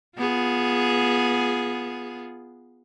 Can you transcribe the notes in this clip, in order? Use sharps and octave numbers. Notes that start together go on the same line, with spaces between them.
B3 F4 G#4